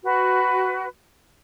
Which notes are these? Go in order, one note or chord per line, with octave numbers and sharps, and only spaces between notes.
F#4 B4